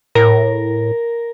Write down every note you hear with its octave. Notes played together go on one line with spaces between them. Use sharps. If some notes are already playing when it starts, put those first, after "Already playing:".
A2 A#4